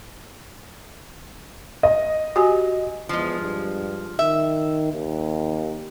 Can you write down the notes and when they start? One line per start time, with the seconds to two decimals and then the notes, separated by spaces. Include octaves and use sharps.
1.83 D#5
2.36 F#4 G4 G#5
3.09 E2 F3 G#3
3.40 G2
4.19 D#3 E5
4.92 D#2